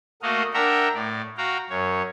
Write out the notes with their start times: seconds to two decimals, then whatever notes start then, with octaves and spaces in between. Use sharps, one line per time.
0.22 A3 A#3 F#4 D#5 F5
0.54 D4 A#4 E5 F#5 G5 A#5
0.94 A2 D5
1.37 F#4 F5 G5 A#5
1.70 F#2 C#5